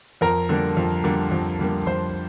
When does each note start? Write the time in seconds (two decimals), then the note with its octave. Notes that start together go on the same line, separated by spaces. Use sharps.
0.21 F2 A#4 A#5
0.49 D3 G3 A#3
0.77 F2
1.04 D3 G3 A#3
1.31 F2
1.59 D3 G3 A#3
1.86 F2 C5 C6